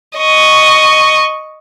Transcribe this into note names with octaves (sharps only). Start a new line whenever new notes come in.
D#5 C#6